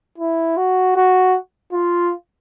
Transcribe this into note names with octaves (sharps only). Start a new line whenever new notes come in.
E4
F#4
F#4
F4